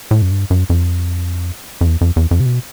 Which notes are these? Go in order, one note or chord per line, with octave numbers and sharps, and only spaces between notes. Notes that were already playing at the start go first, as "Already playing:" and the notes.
A2
F#2
G2
F#2
F2
F2
E2
F2
E2
F2
C3
B2